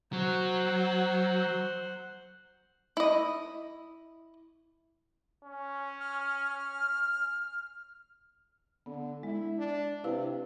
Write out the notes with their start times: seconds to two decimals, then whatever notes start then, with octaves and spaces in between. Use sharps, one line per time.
0.13 F#3 C5 F#5
2.97 E4 D#5
5.44 C#4
6.01 F6
8.86 D3 B3
9.23 G#3 E4
9.58 D4
10.04 C3 E4 B4 F5